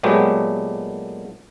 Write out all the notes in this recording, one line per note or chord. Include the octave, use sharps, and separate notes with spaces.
A#2 F#3 G#3 A3 B3 G4